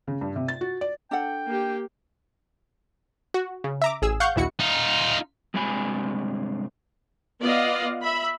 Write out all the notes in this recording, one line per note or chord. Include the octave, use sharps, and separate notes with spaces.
C#3
G2
C3
A6
F#4
D5
D4 A4 F#5 G5
A#3 G4
F#4
C#3
E5 A#5 D6
A1 G#4 E6
F5 F#5 C#6 G6
A#1 D#2 E4 F#4 C#7
D#4 F4
G2 C3 G#3 F5 G#5 B5
B3 F4 D5 D#5 F5
E5 B5